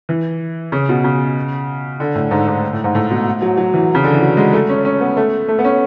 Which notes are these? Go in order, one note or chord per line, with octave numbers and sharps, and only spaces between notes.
E3
C#3
B2
C#3
D3
A2
G#2
G#2
A2
G#2
A2
B2
F#3
F#3
E3
C#3
D3
E3
F#3
G#3
A3
C#4
C#4
B3
A3
A3
B3
C#4